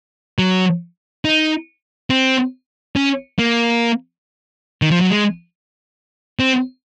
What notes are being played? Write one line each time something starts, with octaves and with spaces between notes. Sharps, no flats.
F#3
D#4
C4
C#4
A#3
D#3
F3
F#3
G#3
C4